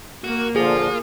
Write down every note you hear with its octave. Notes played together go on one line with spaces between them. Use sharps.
A#3 F#4
A#2 D3 F3 F4 G#4